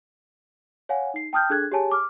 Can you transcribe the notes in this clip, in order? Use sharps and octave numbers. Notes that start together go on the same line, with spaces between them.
C#5 F5 F#5 G#5
D#4 C7
G5 A5 D#6 F6 G6
D4 G#4 A4 F#6 G#6
G4 G#4 C#5 G#5 A5
D6 F6